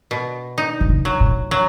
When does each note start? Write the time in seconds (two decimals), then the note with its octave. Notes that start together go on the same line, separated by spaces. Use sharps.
0.11 B2
0.58 D#4
0.80 D#3
0.89 C#3
1.05 F#3
1.20 A#2
1.51 F#3